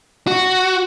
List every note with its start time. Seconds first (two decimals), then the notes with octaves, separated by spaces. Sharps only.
0.27 F#4